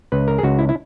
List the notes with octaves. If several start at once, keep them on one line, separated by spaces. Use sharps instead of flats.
C#2 B4
A#4
G#4
C#2 F#4
E4
E4